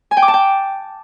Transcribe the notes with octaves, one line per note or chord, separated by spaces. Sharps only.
G#5
G5
D6
A5
G5